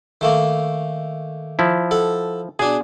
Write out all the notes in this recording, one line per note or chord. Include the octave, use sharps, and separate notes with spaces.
D#3 A3 A#3
F3 E4
A4 F#5
B2 D4 G#4